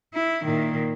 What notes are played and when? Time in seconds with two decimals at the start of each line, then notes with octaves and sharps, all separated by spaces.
0.13 E4
0.44 A#2 D#3